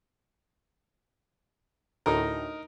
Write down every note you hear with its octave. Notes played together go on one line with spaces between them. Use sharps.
D2 A2 D#4 A#4